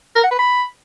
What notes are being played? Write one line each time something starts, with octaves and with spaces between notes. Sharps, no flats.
A#4
F#5
B4
B5